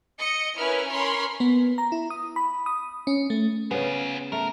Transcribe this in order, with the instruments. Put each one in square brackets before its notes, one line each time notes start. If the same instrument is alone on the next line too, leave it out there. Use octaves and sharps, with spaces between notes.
[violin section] D#5 C#7
C#4 E4 A#4 B4 F6
C#4 A#4 C#5 B5 C6
[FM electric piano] B3
A#5
E4
D#6
B5
D#6
C#4
A3
[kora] C#3 B3 [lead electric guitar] F4 G#4
[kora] A3 [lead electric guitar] A#4